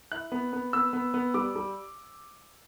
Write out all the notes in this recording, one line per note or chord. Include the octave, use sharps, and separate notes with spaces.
E4 F#6
B3
B3
B3 E6
B3
B3
G3 D6
G3